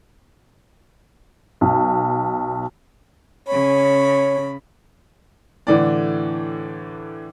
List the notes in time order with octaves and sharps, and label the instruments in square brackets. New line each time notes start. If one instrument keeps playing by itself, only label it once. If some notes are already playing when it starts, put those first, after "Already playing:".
[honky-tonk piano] B1
[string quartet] C#3 B5 [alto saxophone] C#5
[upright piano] A2 D3 E3 D5